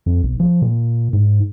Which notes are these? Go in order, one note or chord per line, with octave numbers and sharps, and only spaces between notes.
F2
B1
F3
A#2
G#2